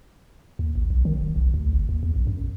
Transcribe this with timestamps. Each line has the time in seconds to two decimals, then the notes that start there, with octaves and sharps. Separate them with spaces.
0.59 D#2
0.75 A1
0.90 B1
1.05 D#3
1.21 D#1
1.36 B1
1.54 D2
1.73 G1
1.89 D#2
2.03 E2
2.16 A#1
2.27 F#2